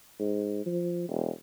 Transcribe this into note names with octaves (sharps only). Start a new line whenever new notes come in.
G#2
F3
E1